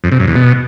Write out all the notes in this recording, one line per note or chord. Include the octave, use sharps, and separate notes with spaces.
F2
C3
F#2
E2
B2